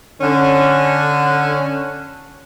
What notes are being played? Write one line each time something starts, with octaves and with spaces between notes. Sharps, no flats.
D3 C#4